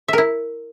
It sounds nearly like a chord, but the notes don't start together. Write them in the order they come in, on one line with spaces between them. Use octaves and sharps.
E5 A#4 E4